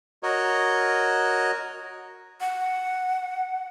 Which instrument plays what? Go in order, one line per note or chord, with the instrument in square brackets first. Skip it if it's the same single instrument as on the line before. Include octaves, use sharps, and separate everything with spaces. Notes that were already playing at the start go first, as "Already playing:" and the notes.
[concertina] F#4 A#4 C#5 D#5
[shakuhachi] F#5